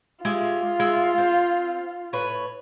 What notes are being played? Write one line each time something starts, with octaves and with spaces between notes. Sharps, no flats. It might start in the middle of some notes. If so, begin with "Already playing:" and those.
G#3 F4 G4 E5
G#3 E5
C4
A2 B4 C#5